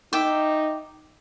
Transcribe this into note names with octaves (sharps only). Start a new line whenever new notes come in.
D#4 E5 G5 D6